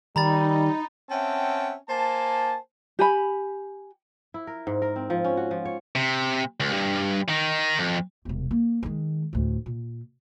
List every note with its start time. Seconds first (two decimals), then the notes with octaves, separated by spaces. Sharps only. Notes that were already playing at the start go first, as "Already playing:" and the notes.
0.16 D#3 G3 D#4 A#5 B5 A6
1.10 C4 C#4 E5 F#5 G5 A5
1.88 A#3 C5 G#5 A5
2.99 G4 G#5 B5
4.34 E4
4.47 A#4
4.67 G#2
4.82 A#4
4.96 C4
5.10 F3
5.24 C#4
5.37 F#4
5.51 F3
5.65 C#5
5.95 C3
6.60 C#2
6.73 G2
7.29 D#3 D#4
7.79 F2
8.25 E1 C2
8.51 A#3
8.83 D#3 G#3
9.33 D2 A2
9.66 A#2